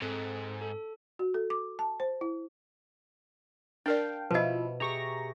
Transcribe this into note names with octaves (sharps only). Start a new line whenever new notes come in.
G#2 C4 A4
A4
F#4
A4
D6
A5
C5
E4
D4 A#4 D5 F5 G5 A5
B2 F3 E4 B4 D#5
G4 G#4 E5 A#5 C#6 A#6